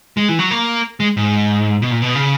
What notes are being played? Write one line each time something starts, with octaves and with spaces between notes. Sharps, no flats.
G#3
E3
F#3
A#3
G#3
G#2
B2
A#2
B2
C#3